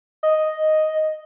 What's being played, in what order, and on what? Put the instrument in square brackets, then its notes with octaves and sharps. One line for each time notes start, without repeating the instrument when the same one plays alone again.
[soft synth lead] D#5